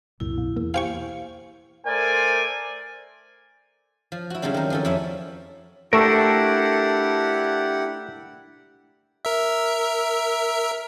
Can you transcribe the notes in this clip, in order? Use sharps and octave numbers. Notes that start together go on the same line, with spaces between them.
C2 F#2 A#2 E4
B2
E2 A#3
G4 C5 F5 G5 G#5 C#6
A3 A#4 C5 D5 G#5
F3
E4 F#4
C#3 F#3 G3 C4 D4
D#3 A#4
F3 C#4 A4
F2 C#4 E4 E5
A3 D4 E4 G4 A4 A#4 F#5
A#4 E5